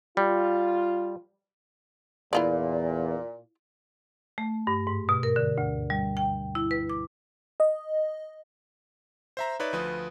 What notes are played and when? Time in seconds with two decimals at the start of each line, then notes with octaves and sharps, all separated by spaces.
0.17 G3 F4
2.33 E2 A#2 E4 F4 D5
4.38 A3
4.67 G2
4.87 G#2
5.09 B2
5.23 A#4
5.36 D3
5.58 D2
5.90 G3
6.17 G5
6.55 E4
6.71 B4
6.90 D6
7.60 D#5
9.37 C5 E5 A#5
9.60 D#4 B4 C#5 D5 E5
9.73 D2 F3 B4 D#6